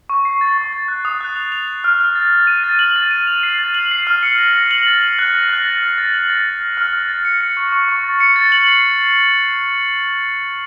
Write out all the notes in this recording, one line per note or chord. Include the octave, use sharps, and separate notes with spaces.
C#6
C7
A6
C#6
A6
F#6
D#6
F#6
F7
F7
F7
F6
F6
A6
A6
D#7
A6
F#7
A6
D#7
F7
C7
A6
F#7
C7
F6
C#7
A#6
A#6
F#7
A6
F#7
F#6
A#6
F#6
A6
F6
A6
F#7
A6
A6
F6
F6
F6
A6
C#7
C#7
C#6
C#6
C#6
A6
C#7
A6
F#7
C7